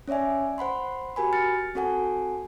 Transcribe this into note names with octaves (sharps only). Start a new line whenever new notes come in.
C#4 C#5 D5 E5 G#5
C5 F#5 B5 C6
F#4 G4 A#4 G#5 B5
F6 A6 C#7
C4 F#4 A4 F#5 G#5